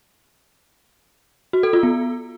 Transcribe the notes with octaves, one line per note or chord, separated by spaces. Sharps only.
F#4
A4
F4
B3